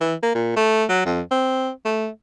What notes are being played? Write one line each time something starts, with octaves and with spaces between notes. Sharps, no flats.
E3
A#3
A#2
A3
F#3
F2
C4
A3